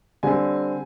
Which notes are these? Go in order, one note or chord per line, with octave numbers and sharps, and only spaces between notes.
D3 G3 C4 G#5